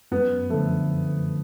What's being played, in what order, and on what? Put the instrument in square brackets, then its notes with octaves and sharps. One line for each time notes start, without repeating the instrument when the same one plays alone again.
[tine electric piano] F#2 [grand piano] B3
[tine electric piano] D3 F3 [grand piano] A3